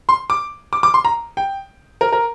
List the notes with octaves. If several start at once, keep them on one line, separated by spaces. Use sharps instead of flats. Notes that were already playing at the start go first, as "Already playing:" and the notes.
C6
D6
D6
D6
C6
A#5
G5
A#4
A#4